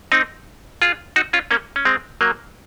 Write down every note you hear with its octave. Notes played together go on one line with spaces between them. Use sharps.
C4 D#4
F4 G#4
D#4 F#4
C#4 F4
A#3 C#4
C#4
G#3 C4
F#3 A#3